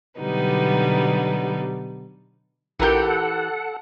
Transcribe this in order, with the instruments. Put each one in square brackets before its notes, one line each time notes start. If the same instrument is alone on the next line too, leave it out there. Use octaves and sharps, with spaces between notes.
[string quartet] B2 D3 F#3 G3 B3 D#4
[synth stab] A#1 A#4 G6 [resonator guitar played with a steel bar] E3 G4 [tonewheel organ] A4 F#5